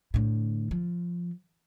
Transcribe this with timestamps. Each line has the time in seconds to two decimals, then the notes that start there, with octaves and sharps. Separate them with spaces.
0.14 A2 D3
0.71 F3